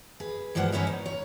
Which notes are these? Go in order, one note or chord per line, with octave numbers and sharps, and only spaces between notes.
G#4 B4
G2 F3 G#3 A#3 B4 F#5
C#4 D#4 E4 B4 C#5 D#5
D#4
C#5